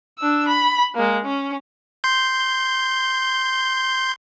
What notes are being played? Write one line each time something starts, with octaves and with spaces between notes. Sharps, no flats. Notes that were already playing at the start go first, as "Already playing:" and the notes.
D4 E6
B5
G#3 A#3
C#4
C6 G6